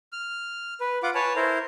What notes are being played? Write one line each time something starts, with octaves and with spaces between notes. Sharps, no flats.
F6
B4
F4 F#5 D6
B4 C#5 G#5 A5
E4 A#4 C5